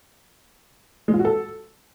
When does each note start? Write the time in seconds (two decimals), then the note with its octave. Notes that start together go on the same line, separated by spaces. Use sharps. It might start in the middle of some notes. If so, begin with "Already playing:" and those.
1.08 G#3
1.14 F4
1.19 F#4
1.25 A4